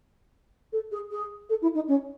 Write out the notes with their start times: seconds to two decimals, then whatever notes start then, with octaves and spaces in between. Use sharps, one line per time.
0.73 A4
0.92 G#4
1.11 G#4
1.49 A4
1.62 E4
1.75 D#4
1.88 C#4